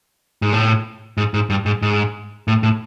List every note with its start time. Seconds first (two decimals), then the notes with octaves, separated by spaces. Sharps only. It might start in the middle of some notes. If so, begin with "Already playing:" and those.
0.42 G#2
0.53 A2
1.17 G#2
1.34 G#2
1.50 G2
1.66 G#2
1.82 G#2
2.48 A2
2.63 A2